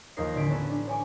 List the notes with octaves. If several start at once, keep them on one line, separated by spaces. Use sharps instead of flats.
D#2 F3 D#4 A#4 G#6 C7
A1 D3 C#4 B6 D7
B3 C#4 A4
D4
C#5 G#5 D6